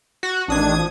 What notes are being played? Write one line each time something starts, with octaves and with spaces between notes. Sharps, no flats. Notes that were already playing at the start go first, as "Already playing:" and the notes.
F#4
A1 D#3 D4 D#6 G#6
F3